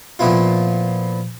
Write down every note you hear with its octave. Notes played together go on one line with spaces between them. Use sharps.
A#2 F3 B3 C4 E4 F4